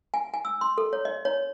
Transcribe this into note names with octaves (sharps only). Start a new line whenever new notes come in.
G#5
G#5
E6
C6
A4
C#5
D#5
C#5